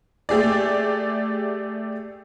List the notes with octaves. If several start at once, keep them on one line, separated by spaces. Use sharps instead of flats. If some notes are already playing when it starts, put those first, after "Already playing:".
A3 G4 G#4 D5